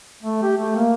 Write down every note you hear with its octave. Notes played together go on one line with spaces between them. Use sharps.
A3
G4
A3
A#3